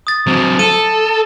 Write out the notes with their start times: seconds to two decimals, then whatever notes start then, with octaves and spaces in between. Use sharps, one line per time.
0.07 D#6 A6
0.27 F#3 C4
0.59 A4 D#7